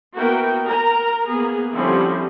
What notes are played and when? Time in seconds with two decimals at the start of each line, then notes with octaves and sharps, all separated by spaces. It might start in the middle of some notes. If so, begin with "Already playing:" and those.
0.17 A#3 B3 E4 F#4 A#4 G5
0.64 A#4 A#5
1.29 A#3 B3 G#4
1.73 D3 F3 G3 C4 C#4 E4